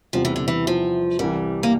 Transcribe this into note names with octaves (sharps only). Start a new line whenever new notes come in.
E2 C3 F3 G3 C4
E3
D3
E3
F3
C2 C3 E3 G3
A#3